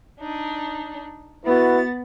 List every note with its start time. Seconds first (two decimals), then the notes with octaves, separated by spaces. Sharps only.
0.20 D4 D#4
1.46 B3 E4 F#4 B4 A6